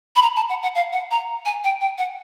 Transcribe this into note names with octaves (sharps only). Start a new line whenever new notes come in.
B5
A#5
A5
F#5
F#5
F5
F#5
A#5
G#5
G5
G5
F#5